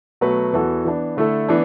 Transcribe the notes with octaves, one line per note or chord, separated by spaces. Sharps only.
B2 F#3 A3 F#4 B4
E2 E3 B3 F#4 A4
E3 B3 D4
D3 A3 E4 A4
E3 B3 D4